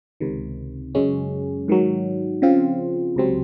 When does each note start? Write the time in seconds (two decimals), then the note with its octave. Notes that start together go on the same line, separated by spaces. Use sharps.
0.20 C#2 C3 D#3
0.95 F#2 C#3 G#3 C#4
1.68 G#2 D#3 F#3
2.42 C#3 F3 C4 F4
3.16 C#2 C3 F#3 C4